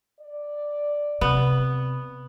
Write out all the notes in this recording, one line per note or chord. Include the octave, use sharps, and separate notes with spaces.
D5
C3 B3